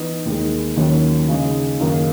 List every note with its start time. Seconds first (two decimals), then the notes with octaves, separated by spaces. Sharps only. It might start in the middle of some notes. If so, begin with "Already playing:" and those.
Already playing: E3 B3 D#4
0.25 D#2 D#3 G#3
0.76 D#2 D#3 F#3 C#4 F#4
1.28 C#3 G#3 D#4
1.80 F#2 D#3 A#3 D#4 G#4